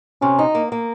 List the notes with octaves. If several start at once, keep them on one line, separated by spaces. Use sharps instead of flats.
C3 C#4
D#4
A#3
A#3